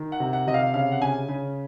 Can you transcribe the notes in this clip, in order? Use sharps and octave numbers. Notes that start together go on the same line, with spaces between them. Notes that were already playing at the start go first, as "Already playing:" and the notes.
Already playing: D#3
F#5
C3
F#5
C3 D#5
F5
C#3 F5
F#5
C#3 G#5
C#3